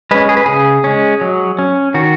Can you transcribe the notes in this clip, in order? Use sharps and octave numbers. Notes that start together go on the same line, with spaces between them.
G#3 C#4 B4
G#4
B4
C#3 G#4
G#3 C#4
F#3
C#4
D#3 F#4